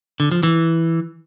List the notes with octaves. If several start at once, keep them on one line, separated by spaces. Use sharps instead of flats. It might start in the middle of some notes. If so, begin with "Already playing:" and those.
D3
F3
E3